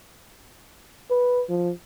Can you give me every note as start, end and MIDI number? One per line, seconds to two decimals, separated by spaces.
1.10 1.43 71
1.49 1.71 53